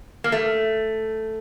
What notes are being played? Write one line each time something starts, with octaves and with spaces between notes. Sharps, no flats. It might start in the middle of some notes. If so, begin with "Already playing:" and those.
A#3
A3